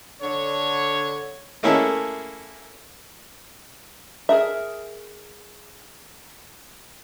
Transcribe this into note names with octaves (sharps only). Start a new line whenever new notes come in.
D3 C#5
A3 A#3 C#4 E4 G#4 A4
G#4 A#4 E5